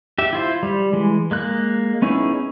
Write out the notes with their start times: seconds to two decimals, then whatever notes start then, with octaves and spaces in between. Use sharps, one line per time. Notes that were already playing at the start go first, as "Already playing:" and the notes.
0.18 G4 E5
0.33 E4 F4 C5
0.63 G3
0.93 E3 G#3
1.31 G#3 A#3 F#6
2.02 B3 C#4 D#4 E4 G#4